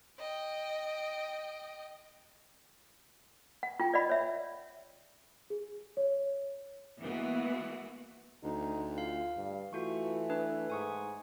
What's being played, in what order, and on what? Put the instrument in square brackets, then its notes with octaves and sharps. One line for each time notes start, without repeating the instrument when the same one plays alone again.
[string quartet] D#5 G5
[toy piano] F#5
F4 G5
D5 D#5 F#5 B5
C#5 E5
[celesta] G#4
C#5
[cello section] E3 G#3 A#3 B3 F#4
[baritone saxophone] D2 [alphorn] D#4
[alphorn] F4 [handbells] F5
[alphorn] G2
[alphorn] E3 [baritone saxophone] A3 [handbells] F4 F#4 C#6
[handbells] D4 B4
[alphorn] G#2 [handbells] G#5 C#6 D#6